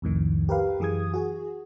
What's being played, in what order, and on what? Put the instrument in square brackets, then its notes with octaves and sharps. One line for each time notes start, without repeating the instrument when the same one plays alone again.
[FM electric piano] C2 F2 A2 D#3
G4 A#4 B4 F5
F#2 E3 G#4 D#6 G#6
F#4 G#4